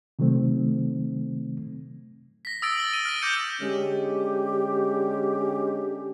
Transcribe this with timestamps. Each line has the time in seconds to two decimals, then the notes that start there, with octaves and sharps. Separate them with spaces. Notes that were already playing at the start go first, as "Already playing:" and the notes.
0.19 C3 D#3 F#3 A3 C4
2.45 A#6 B6
2.62 D#6 E6 A6 D7
2.77 F#7 G7
2.93 D#7
3.05 F6 A#6
3.22 D6 F6 G6 C#7 D#7
3.61 D3 G#3 C#4 G4